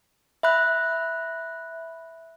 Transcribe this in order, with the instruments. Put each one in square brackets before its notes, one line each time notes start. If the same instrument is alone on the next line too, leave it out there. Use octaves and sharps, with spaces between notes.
[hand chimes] E5 B5 F#6